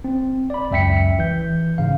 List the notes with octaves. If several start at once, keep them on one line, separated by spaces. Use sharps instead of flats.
C4
D5 B5
C#2 F#2 E5 G5 B6 C#7
E3 G6
G#2 C#3 F5